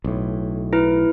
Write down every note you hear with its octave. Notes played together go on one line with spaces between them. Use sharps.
B1 A2
E4 B4